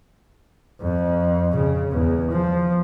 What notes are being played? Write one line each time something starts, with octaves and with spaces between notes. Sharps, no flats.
F2
C#3
E2
F3